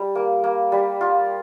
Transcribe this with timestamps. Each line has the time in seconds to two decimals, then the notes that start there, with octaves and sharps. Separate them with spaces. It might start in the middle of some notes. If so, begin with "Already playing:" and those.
Already playing: G3
0.15 A#3
0.44 A#3
0.72 G3
1.01 F4